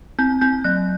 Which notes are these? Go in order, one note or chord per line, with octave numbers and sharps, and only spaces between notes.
C4 G6
C4 G6
F#3 F#6